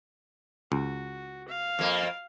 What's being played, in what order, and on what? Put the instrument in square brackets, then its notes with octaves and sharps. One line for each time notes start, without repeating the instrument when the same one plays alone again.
[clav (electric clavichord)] C#2 [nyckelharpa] F#4
[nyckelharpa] F5
[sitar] F2 A#3